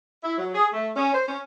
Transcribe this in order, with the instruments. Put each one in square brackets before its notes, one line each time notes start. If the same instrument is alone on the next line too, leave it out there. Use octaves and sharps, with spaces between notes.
[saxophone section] E4
F#3
G#4
A3
C#4
C5
C#4